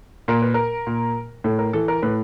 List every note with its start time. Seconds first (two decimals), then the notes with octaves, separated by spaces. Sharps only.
0.28 A#2 A#4
0.42 B4
0.54 A#4
0.87 A#2
1.44 A2 A4
1.59 A#4
1.73 E3 A4
1.88 A#4
2.02 A2 B4